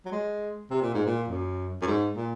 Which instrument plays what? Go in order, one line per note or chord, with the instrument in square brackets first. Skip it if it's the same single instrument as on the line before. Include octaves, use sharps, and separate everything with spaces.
[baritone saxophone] F#3
G#3
C3
A#2
G#2
A#2
F#2
F#2
G#2
A#2